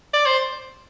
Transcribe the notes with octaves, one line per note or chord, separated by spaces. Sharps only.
D5
C5